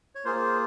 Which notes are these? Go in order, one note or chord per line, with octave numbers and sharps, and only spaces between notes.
C#5
A#3 F4 G#4 C5